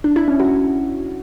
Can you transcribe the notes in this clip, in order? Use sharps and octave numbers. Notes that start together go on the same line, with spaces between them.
D4
E4
C#4
F#4